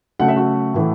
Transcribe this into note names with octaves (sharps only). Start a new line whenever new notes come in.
C#3 F#3 A3 F#5
E5
F#4 F#5
A2 E3 A3